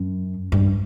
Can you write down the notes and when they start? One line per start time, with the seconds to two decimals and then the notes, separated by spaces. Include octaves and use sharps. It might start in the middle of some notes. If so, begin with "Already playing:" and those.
Already playing: F#2
0.52 G2